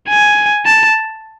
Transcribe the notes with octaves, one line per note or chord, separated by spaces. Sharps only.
G#5
A5